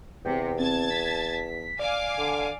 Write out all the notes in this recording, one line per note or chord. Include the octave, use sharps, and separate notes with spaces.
E2 C3 G5
C4 A5 G#6 A6
B6
D5 F5 G#5 D6
D3